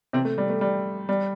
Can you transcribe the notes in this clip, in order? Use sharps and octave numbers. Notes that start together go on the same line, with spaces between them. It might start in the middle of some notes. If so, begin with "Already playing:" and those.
C3 C4
A3
G3
A3
G3
G3